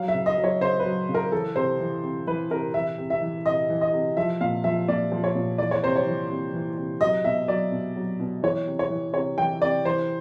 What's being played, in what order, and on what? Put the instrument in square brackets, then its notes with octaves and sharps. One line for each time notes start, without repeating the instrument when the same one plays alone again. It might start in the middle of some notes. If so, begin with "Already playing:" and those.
Already playing: [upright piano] F#3 F5
E5
C#3
D#5
F#3
C#5
C#3 C5
B4
F#3
C#3
A#4
E3 A4
C3 C5
E3
C3
E3 B4
C3 A#4
E3 E5
C3
E5
E3
C3 D#5
E3
D#5
C3
F3 E5
A#2 F5
F3 E5
A#2 D5
F3
C#5
A#2
E3 D5
C#5
C3 C5
C#5
E3
C3
E3
C3
F#3 D#5
B2 E5
F#3 D5
B2
F#3
B2
E3 C#5
C3
C#5
E3
C3 C#5
E3 G5
C3 D5
E3 C5